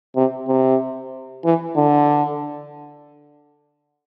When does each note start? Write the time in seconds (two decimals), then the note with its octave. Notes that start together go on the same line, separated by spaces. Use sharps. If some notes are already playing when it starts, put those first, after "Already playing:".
0.16 C3
0.48 C3
1.45 E3
1.77 D3